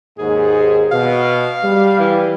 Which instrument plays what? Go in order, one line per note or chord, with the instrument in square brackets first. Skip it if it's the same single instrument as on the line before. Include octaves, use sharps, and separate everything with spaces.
[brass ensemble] D#2 G#2 [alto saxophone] G#4
[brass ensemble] B2 [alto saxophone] F5
[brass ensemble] G3
[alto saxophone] E3